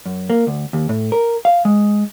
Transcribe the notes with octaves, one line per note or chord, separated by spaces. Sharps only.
F#2
A#3
D2
D#2
A2
A#4
F5
G#3